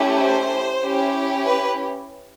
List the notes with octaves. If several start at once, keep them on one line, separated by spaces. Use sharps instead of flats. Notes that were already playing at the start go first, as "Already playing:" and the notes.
Already playing: A3 C#4 E4 G4
C5
C#4 E4 G4
B4